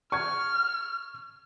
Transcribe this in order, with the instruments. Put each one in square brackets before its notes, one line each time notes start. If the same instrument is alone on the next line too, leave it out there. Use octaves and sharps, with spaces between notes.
[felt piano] C#6 G#6 [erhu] F6